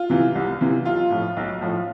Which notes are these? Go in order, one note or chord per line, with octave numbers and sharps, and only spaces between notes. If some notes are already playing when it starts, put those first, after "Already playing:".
Already playing: F4
C3 E3
C2
C3 E3
B1 F4
A2 F3
B1
A2 F3